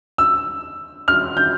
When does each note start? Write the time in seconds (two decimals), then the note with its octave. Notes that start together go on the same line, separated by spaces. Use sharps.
0.18 E6
1.08 F6
1.37 G6